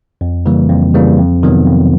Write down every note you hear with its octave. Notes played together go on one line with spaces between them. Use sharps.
F2
C#3 E3 G3 A#3
F2
C#3 E3 G3 A#3
F2
C3 D#3 F#3 B3
F2